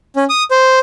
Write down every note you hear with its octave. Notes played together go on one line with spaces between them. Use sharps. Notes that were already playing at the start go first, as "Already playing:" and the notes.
C#4
D#6
C5